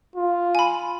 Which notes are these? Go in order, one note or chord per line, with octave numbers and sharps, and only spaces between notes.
F4
G#5 B5